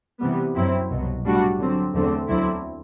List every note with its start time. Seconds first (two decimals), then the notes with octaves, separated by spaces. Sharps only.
0.20 C3 E3 G3 B3
0.55 F#2 F#3 C4 E4
0.90 C2 B2 F#3
1.24 A2 G3 D4 F#4
1.59 D3 F#3 C4
1.94 E2 D3 F#3 A3 C4
2.29 D2 D3 F#3 C4 E4